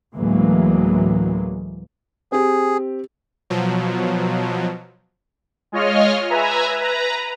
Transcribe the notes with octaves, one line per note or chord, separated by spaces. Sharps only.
D2 A2 E3 F#3 G#3 A#3
C4 G4 G#4
B2 F3 F#3
G#3 F4 C#5 D#5 F6
B4 E5 G#5 A#5
B4 A#5